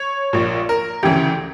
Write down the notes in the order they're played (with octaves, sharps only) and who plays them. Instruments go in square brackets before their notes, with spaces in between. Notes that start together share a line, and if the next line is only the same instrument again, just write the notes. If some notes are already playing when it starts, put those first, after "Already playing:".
Already playing: [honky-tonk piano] C#5
A#1 A#2
A#4
D2 C#3 E3 G4